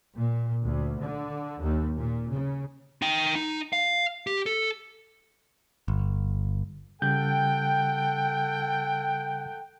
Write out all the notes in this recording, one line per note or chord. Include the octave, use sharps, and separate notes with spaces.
A#2
D2
D3
D#2
A#2
C#3
D#4 G5
D#4
F5
G4
A4
G1
C#3 G3 A4 F#5 G5 G6